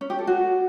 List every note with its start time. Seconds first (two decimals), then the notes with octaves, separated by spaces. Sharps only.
0.01 C#4
0.10 G4
0.19 A4
0.27 F#4